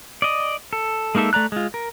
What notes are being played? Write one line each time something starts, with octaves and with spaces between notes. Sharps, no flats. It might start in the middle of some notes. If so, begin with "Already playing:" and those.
D5 D#5
A4
G#3 A#3 D#4 A4 E5
A3 D5 A#5 F#6
G#3 F4
A#4